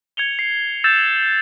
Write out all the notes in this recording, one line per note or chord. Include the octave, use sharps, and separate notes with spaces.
G#6 C#7 F7 G7
C7
E6 G6 A6 E7